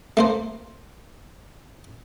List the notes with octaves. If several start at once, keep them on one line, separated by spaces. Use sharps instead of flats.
A3 A#3 C5